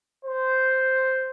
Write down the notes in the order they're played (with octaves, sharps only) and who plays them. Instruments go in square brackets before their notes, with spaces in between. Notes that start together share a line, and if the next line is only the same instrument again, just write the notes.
[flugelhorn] C5